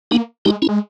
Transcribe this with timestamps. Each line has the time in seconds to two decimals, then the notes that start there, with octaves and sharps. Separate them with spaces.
0.11 A#3 B3 D#4
0.45 G#3 D#4 G4
0.62 C#4 E4
0.69 G#3